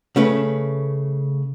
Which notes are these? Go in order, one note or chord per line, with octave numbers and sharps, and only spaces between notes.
C#3 A3 C#4 B4